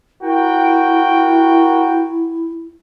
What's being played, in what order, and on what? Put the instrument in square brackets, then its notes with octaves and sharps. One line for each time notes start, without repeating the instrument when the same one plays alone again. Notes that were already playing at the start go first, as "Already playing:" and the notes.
[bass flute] E4 [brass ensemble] F#4 A#4 G5